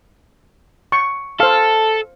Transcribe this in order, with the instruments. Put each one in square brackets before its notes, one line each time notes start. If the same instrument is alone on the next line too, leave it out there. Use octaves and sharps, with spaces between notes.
[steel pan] C#6
[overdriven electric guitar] A4 [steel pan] C5 F5